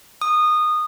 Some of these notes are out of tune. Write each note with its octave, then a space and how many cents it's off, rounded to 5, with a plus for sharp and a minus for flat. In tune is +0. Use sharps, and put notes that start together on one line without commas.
D#6 -20